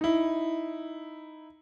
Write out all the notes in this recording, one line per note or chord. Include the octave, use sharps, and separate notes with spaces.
D#4 E4